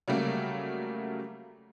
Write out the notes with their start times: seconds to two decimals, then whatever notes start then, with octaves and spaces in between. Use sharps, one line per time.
0.08 C#3 F#3 G3 A3 A#3